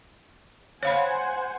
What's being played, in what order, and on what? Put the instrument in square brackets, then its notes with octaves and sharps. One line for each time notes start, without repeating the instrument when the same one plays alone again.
[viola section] C5 F#5 G#5 [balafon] C#5 F5 B5